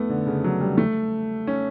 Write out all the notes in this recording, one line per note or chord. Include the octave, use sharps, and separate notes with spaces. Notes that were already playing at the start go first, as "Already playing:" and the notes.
Already playing: A3 B3
D3
C#3
F#3
G3
A3
C#4